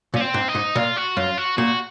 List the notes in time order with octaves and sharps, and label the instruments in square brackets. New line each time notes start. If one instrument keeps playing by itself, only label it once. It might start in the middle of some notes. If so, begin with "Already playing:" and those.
[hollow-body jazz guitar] A#2
[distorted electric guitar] C#4
C4
[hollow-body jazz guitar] G#2
[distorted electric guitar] D#4
[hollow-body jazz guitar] G#2
[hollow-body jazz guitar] A#2 [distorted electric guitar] F4
[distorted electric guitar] F#4
[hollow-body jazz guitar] F#2 [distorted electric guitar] F4
[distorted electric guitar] F#4
[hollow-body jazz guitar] A#2 [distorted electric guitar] F#4